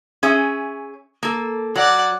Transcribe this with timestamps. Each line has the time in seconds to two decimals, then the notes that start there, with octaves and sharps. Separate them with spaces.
0.23 C#4 G#4 E5
1.23 A#3 A4
1.76 F#3 D5 F#5